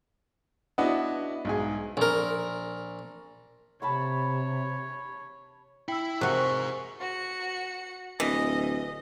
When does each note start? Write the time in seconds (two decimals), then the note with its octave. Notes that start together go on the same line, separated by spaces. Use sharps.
0.78 B3 D4 E4 F#4 D#5 E5
1.45 B1 G#2 G#4
1.97 A#1 A#4
3.82 C3 C#5 A5 B5 C#6
5.88 E4 G5 E6
6.21 C3 F#4 G#4 A#4 C5 C#6 F#6
7.00 F#4 C#7
8.20 D1 E3 D#5